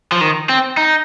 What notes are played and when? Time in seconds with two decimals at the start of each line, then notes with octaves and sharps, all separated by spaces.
0.12 F3
0.21 D#3
0.49 C4
0.77 D#4